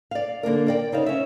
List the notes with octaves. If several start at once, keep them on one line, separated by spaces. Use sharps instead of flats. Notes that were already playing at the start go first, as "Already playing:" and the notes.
D5 F5
D3 A#3 D4 A#4
A#4 D5 G5
C#3 D#4 C5 F5
C#4 E5